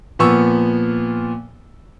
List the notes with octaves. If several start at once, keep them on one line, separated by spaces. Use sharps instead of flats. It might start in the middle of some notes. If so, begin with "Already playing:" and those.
A#2 F3 B3 C#6 E6